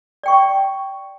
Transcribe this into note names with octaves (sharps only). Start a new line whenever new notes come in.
D5 G5 C#6